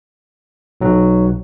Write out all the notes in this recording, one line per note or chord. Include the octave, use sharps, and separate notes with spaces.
B1 F#3